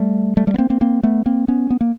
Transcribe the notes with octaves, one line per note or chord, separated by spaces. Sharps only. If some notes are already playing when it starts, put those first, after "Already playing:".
Already playing: G3 A3
G3 A3
G3 A3
B3
A#3 C4
A#3 C4
A#3 C4
A3 B3
A#3 C4
B3 C#4
B3
A#3